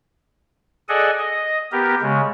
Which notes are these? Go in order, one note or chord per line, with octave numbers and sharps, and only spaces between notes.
G#4 A4 D5 D#5 F#5 G#5
D#5
B3 G4 A#4
C#3 G#3